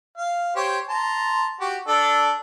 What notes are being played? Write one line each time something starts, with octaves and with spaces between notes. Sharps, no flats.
F5
G4 C5 C#5
A5 A#5 C6
F#4 G4
D4 A4